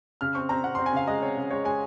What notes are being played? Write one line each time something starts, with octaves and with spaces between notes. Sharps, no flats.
C#3 F6
C4 C#6
C4 A#5
C4 F#5
C4 C6
G#5
C#3 F5
G#3 D#5
C4 C#5
C#3
G#3 C#5
G#3 G#5